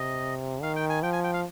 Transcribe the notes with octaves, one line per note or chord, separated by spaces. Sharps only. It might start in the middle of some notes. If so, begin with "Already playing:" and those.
Already playing: C3 D#5
D#3 F5
G5
G#5
F3 G5
G#5
G5
F5